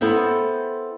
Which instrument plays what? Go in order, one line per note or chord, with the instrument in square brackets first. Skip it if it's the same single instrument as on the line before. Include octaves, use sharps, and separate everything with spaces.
[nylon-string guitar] B3 C4 E4 A4 C5 E5